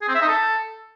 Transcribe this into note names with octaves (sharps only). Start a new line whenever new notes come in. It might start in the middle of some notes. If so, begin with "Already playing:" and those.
G#4
C4
E5
D#4
A4